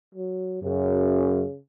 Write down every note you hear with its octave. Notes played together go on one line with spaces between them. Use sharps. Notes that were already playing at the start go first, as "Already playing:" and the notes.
F#3
F#2 C#3